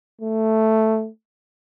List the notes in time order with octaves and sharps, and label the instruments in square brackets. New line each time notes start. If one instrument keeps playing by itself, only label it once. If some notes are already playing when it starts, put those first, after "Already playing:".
[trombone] A3